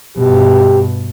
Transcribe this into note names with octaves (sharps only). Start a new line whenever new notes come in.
G2 B2 G4